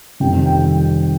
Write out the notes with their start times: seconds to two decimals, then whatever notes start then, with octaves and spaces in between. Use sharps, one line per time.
0.20 F2 C3 D#3 G3 G5
0.46 G5